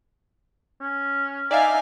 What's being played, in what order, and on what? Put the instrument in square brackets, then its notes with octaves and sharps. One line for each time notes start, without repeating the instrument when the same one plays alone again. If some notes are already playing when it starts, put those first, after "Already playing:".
[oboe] C#4
[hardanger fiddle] D#4 G#5 [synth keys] D5 E5 F5